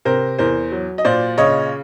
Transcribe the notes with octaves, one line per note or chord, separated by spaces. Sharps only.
C3 A#4 C5
E2 A#4 C5
F#3
D#5
A#2 C5 D5
C#3 C#5 D#5